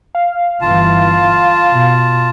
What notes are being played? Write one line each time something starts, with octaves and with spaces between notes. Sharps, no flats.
F5
G1 E3 F4 A5
B2